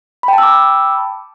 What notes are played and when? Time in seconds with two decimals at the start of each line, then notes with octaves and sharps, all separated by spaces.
0.23 B5
0.28 G5
0.33 A5
0.38 E6
0.43 D6